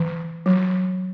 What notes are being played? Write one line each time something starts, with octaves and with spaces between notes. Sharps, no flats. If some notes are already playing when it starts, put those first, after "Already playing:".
Already playing: E3
F#3